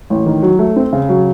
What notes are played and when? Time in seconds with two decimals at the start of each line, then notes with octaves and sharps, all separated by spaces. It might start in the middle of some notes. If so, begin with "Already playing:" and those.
0.10 A1
0.26 D#3
0.43 F#3
0.59 A3
0.76 C4
0.93 C#3
1.09 F#3